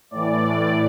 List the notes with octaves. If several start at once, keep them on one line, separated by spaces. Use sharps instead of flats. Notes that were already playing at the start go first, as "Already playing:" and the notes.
A2 E3 D5